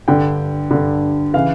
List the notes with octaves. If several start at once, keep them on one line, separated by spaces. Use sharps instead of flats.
G2 D3 G5
G2 D3
C#3 E3 F5